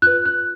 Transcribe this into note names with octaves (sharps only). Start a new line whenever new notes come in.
F4 B4 F#6
F#6